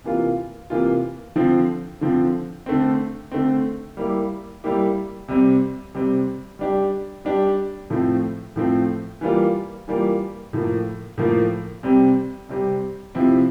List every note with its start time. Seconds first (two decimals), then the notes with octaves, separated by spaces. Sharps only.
0.04 C3 E3 A#3 F4
0.70 C3 E3 A#3 F4
1.36 D3 F3 C4
2.01 D3 F3 C4
2.66 D3 A3 C4
3.32 D3 A3 C4
3.97 G3 A#3 E4 G4
4.64 G3 A#3 E4 G4
5.28 C3 G3 C4
5.94 C3 G3 C4
6.59 G3 D4 G4
7.25 G3 D4 G4
7.90 A2 F3 A3 C4
8.56 A2 F3 A3 C4
9.21 E3 G3 A#3 F4
9.88 E3 G3 A#3 F4
10.53 A2 F3 A#3
11.18 A2 F3 A#3
11.83 C3 G3 C4 G4
12.49 C3 G3 C4 G4
13.15 C3 F3 C4 E4